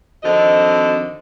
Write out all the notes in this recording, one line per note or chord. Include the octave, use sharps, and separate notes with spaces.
F2 D3 D#3 C4 F#4 D#5